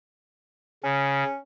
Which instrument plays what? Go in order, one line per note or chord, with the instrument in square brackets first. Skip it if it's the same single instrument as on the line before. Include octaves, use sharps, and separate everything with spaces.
[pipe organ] C#3 [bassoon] C#4